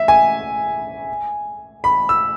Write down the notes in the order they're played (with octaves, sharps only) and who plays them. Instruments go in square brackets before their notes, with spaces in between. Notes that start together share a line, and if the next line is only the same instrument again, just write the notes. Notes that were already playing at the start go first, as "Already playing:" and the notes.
Already playing: [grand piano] E5
G#5
B5
E6